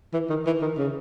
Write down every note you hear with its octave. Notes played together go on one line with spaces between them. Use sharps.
E3
D#3
E3
D#3
C#3